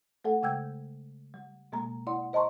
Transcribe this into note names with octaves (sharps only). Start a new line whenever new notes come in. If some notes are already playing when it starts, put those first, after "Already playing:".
A3 A4 F#5
C#3 G#3 G5 E6 G6 G#6
G3
B2 G#3 A#3 A#5
E4 D5 F#5 C6
C5 D#5 A5 A#5 C6 C#6